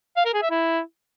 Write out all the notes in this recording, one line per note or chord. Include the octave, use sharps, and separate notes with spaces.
F5
A#4
G#4
E5
E4